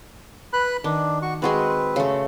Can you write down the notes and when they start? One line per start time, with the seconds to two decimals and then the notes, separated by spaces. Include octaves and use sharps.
0.53 B4 B5 F#6
0.84 D#3 D4
1.22 F#4 C#6
1.42 G#3 C4 F#4 G#4 B4
1.96 C#3 A3